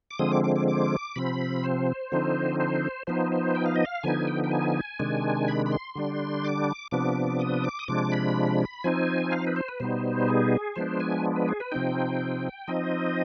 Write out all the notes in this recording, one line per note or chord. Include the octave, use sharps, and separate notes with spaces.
D6
D3 F3 G#3 C4 D#6
D6
D6
D6
D6
C3 F3 C4 B5
C5
D3 F3 C4 D#4
C5
F3 B3 D#4 C5
C5
G5
F5
D#5
F5
D3 F3 B3 D#4 G#5
G5
G5
G#5
C3 D#3 G#3 D4
B5
B5
C6
D3 G3 D4
D6
C3 F3 B3 D4 D6
D#6
D6
D#6
C3 F3 G#3 D4 D6
B5
F3 C4 D#4 G#5
F5
B4
C5
B4
B2 G3 B3 D#4 C5
G#4
F3 G#3 B3 D4 C5
G#5
B4
G#4
B4
C3 F3 C4 D#4 G5
F3 C4 D#4 D#5